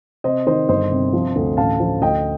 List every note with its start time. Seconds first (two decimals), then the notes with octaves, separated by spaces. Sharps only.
0.24 C3 C5 D#5
0.47 D#3 C5 D#5
0.69 G1 C5 D#5
0.91 C3
1.13 F3
1.36 D2
1.57 A1 F5 A5
1.80 F3
2.02 D2 D#5 G5